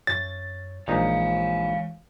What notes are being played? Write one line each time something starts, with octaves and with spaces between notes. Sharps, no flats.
F#2 C#5 A6
A#1 E3 G#3 D#4 C#5 F5